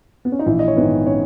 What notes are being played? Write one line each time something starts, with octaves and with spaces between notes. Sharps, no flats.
B3
C#4
D#4
A#1 E3 E4
D#5
C#5
G#2 D#3 B3 B4
C#4 C#5